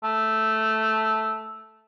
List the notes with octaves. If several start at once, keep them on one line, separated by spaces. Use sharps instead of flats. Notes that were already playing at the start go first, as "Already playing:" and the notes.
A3